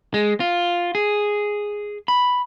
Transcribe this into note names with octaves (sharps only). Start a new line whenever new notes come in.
G#3
F4
G#4
B5